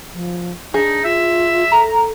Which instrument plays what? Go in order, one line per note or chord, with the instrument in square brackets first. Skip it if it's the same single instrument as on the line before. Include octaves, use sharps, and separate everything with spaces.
[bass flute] F3
[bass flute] D4 [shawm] D#4 [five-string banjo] G#4
[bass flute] F4 [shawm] E5
[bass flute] A4 [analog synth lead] A#5